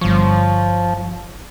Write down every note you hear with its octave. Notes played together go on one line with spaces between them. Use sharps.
G1 F3 C#5